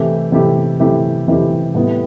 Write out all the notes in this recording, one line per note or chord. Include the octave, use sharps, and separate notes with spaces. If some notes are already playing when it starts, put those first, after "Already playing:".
Already playing: C3 E3 A3 E4 G4
C3 E3 A3 E4 G4
C3 E3 A3 E4 G4
C3 E3 A3 E4 G4
A2 G3 B3 E4